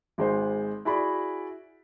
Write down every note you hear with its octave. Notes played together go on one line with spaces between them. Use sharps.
G#1 G#3 C5
E4 F#4 G#4 D5 B5